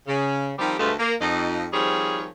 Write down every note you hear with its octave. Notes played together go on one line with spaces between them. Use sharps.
C#3
D#3 F3 G3 C4 G4
D2 G2 G#3 A3 F4 B4
A#3
F2 D#4
D#3 F3 G3 C4 G#4 C#5